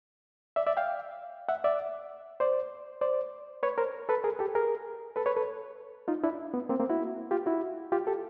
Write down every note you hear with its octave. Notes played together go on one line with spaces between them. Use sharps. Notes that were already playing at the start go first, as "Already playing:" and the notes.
D5 E5
D5 E5
F5 G5
E5 F#5
D5 E5
C5 D5
C5 D5
B4 C#5
A#4 C5
A4 B4
G#4 A#4
G4 A4
G#4 A#4
A4 B4
B4 C#5
A4 B4
D#4 F4
D4 E4
B3
A#3 C4
A#3 C4
E4 F#4
F4 G4
E4 F#4
F4 G4
G4 A4